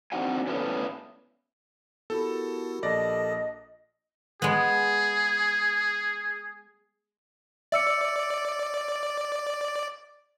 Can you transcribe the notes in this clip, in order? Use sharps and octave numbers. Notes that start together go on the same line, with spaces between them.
C4 D4 D#4 F#4 F#5 G#5
A2 A3 B3 C#4 D4
B3 E4 F#4 G4 A4 A#4 B5
A#1 A4 D5 D#5 A5 A#6
G#3 B3 G#4
D5 E5 E6 C#7